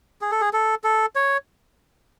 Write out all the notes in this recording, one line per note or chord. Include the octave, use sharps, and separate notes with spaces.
G#4
A4
G#4
A4
A4
C#5